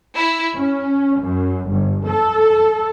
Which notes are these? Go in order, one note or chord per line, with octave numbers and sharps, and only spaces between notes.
E4
C#4
F#2
G1
A4